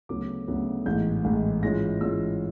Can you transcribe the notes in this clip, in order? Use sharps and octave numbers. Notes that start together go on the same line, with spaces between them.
D2 C#3 F#3 B3 D6
D2 C#3 F#3 B3
A1 G#2 E3 G#3 G6
A1 G#2 E3 G#3
G#2 E3 G#3 C#4 F4 A#6
G#2 E3 G#3 C#4 F4 E6